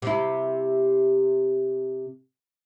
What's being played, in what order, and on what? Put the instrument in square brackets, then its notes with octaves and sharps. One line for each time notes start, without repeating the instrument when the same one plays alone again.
[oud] C3 E4